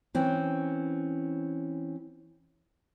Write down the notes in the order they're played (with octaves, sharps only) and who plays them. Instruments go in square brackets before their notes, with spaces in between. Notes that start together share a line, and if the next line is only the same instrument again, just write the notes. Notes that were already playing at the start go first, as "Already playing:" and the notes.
[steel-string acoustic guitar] E3 C4 C#4